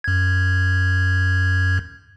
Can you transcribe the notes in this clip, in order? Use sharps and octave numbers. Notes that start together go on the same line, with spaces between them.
F#2 G#6